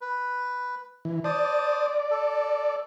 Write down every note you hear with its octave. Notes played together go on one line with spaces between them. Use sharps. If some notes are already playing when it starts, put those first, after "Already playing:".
B4
E3
C5 D5 A5 D#6
A4